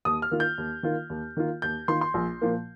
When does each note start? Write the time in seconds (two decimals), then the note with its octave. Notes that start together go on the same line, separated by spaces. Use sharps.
0.05 D#2 D#6
0.22 F6
0.31 D#3 A#3 F4
0.40 G6
0.58 D#2
0.83 D#3 A#3 F4
1.10 D#2
1.37 D#3 A#3 F4
1.62 D#2 G6
1.88 D#3 A#3 F4 C6
2.01 C6
2.14 A#1
2.42 A#2 F3 A#3